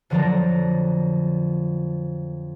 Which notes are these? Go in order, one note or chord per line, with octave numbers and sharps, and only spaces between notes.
F2 D3 F3 F#3 D5 A#5